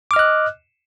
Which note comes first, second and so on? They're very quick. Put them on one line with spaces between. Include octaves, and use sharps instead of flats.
D6 F6 D#5 F#6